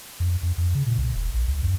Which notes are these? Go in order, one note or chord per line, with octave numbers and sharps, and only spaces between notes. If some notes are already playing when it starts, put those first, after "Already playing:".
F2
F2
F2
C#3
A#2
C2
E1
A#1
C#2
F#2